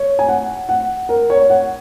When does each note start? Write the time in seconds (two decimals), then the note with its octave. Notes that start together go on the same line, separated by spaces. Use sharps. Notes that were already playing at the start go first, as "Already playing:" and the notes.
Already playing: C#5
0.19 G#5
0.28 F#5
0.69 F#5
1.09 A#4
1.30 C#5
1.50 F#5